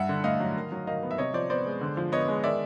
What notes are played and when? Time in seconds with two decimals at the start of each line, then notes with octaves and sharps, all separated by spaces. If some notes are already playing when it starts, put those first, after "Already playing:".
Already playing: G2 E5 F#5
0.09 D3
0.24 A3 D#5 F5
0.40 F#3
0.56 D#3
0.72 F#3
0.87 D#3 D#5 F5
1.03 B3
1.11 E5
1.18 C3 C#5 D#5
1.34 F3 C5 D5
1.50 B3 C5 D5
1.66 G#3
1.81 D3
1.97 F3
2.12 B3 C#5 D#5
2.28 G#3
2.44 D#3 D5 E5